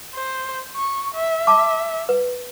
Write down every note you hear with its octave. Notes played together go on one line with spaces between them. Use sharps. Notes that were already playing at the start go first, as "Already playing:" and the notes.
C5
C#6
E5
A5 D6
B4